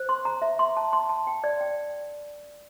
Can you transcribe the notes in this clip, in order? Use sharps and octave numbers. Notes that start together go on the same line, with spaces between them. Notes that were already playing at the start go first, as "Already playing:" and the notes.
Already playing: C5
C6
A#5
E5
C6
A5
C6
A5
G5
D5
G5